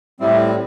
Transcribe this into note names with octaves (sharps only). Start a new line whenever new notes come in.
A2 G3 C4 E4